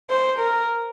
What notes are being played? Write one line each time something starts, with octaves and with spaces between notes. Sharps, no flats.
C5
A#4